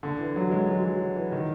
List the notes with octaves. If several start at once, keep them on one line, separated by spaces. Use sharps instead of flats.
D3
E3
F#3
G#3
F#3
F#3
E3
D#3